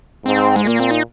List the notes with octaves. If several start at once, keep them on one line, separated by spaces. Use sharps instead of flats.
G#2 C4
G#3
A#2 A#3
C4
D#4